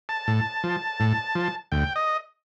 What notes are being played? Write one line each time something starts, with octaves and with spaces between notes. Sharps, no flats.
A5
A2
F3
A2
F3
D2 G5
D#5